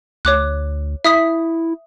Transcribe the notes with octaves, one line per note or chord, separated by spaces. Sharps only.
D2 C#5 D6 F#6
E4 E5 D#6 B6